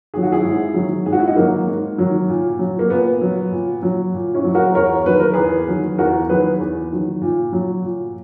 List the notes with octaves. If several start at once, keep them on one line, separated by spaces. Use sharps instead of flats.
D#3 F#3 G#4
F#4
E4 G#4
G#2
D#3 F#3
G#2 G#4
F#4
E4
D#4 F#4
D#3 F#3 A#3
G#2
D#3 F#3
A#2
F#3
A#3
A#2 B3
F#3
A#2
F#3
A#2
C#4 E4
F#3
F#4 A#4
E2 A#4 C#5
D#3 F#3 B4
A#4
E2 G#4 B4
D#3 F#3
E2 F#4 A#4
D#3 F#3 G#4 B4
E2
D#3 F#3
A#2
F#3
A#2